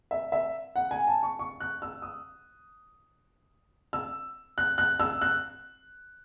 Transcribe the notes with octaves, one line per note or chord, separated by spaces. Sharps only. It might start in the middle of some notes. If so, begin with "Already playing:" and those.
E5
E5
F#5
G#5
A5
C#6
C#6
F#6
E6
D#6
E6
F#6
F#6
E6
F#6